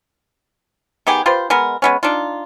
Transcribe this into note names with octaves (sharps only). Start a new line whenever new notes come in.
D#3 B3 G4 G#4
F4 G4 B4 C5
G#3 B3 A#4
G#3 B3 C#4
D4 D#4 F4